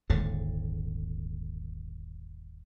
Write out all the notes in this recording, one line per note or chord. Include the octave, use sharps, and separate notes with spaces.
D#1 G#1 G#2 D3